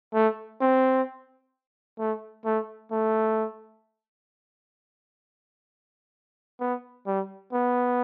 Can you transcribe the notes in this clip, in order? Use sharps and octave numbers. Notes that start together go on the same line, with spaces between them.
A3
C4
A3
A3
A3
B3
G3
B3